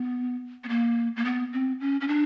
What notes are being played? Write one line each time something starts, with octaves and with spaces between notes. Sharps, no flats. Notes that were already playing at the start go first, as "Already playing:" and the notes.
Already playing: B3
B3
A#3
A#3
B3
C4
C#4
C#4
D4